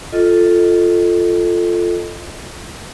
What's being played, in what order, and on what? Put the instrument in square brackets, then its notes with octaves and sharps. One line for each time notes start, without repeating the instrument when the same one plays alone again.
[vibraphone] F4 A4 D#5